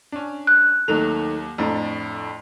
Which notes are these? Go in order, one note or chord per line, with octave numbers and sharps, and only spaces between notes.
C#4 D4
F#6
D#2 D#3 F#3 A3 F7
F2 A2 D4 A#5